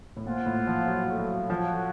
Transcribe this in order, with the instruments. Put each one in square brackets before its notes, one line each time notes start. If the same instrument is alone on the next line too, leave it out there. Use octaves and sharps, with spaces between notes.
[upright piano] A2
[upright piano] A#2 [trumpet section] F4 C5 F#5
[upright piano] A2
F3
F#3
A3
F#3
[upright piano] F3 [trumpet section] F#4 A4 C#5 F#5